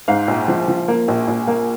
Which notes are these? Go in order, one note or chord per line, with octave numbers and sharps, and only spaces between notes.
G#2 F5
A#1
F3
F3
A#3
A#1
A#1
A#3